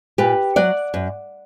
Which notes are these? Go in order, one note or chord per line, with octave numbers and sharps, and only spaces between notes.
A#2 G4 B4
F#3 D5 F#5
F#2